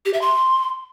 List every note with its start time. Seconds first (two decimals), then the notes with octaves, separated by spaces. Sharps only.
0.06 G4
0.14 E5
0.21 C6